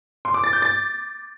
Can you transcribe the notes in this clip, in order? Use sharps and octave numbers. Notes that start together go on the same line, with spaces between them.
C6
D6
A6
G6
A6